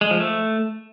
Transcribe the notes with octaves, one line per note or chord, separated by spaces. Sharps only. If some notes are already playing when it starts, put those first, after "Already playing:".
G#3
F3
A3